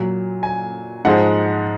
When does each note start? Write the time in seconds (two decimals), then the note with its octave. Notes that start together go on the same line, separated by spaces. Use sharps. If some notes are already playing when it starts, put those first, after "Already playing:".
Already playing: A#2 F#3
0.43 G#5
1.05 G#2 F3 G#3 F#5